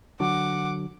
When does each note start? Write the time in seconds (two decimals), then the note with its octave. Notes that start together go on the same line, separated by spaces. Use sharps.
0.20 D3 F#3 F#5 D6